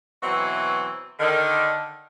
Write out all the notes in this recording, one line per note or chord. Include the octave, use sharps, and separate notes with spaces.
B2 E3 F#3 C4 F#4 E5
D3 D#3